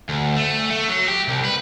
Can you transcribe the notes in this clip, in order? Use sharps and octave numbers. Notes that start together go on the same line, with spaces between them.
D2
A3
A3
F#3
G4
C2
B4